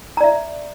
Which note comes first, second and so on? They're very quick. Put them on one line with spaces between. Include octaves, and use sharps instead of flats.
A#5 D5 E5